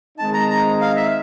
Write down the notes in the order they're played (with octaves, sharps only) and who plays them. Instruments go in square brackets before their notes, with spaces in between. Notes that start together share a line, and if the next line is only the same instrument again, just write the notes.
[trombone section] D#3 G#3 C4 D#4 [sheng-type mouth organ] A5
[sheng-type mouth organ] A#5
A#5
F5
E5